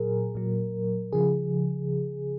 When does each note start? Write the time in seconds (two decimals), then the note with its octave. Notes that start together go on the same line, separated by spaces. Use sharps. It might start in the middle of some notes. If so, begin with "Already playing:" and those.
Already playing: A#2 F#3 G#4 A#4
0.35 A#2 F#3
1.13 C#3 F3 G#4